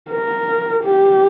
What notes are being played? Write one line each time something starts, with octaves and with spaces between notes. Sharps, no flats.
A#4
G4